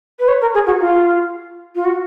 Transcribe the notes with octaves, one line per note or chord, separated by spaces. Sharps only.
B4
C#5
A#4
G#4
F#4
F4
F4
F#4